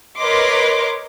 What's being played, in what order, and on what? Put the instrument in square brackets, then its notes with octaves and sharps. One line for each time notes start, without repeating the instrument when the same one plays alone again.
[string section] A#4 B4 C#5 D#5 C6 D6